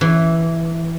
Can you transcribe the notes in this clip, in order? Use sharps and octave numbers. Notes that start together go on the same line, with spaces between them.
E3